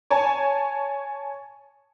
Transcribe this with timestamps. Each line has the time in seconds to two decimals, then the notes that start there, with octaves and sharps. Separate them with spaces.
0.10 C#5 G#5 A5